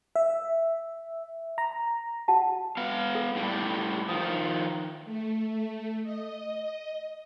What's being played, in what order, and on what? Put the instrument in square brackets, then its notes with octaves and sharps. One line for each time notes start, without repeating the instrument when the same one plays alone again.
[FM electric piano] E5
A#5
[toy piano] F#4 F#5 A5
[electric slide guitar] B3 F5
[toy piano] A4 A#4
[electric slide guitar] A2 G3
[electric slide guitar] D#3 F3 [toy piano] G5 D#6
[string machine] A3
D#5